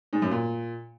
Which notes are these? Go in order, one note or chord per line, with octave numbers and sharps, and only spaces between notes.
G#2
F#2
A#2